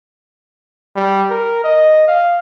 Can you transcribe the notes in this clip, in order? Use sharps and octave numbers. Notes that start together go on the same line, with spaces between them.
G3
A#4
D#5
F5